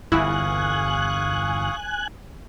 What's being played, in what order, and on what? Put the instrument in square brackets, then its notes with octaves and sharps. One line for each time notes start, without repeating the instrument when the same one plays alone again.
[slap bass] G1 E2 [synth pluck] E4 [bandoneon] F5 C#6 D#6 [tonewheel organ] G#5 F#6